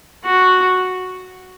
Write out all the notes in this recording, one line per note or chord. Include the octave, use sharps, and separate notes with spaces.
F#4